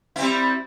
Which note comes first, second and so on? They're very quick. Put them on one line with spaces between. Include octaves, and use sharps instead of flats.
E4 C4 G3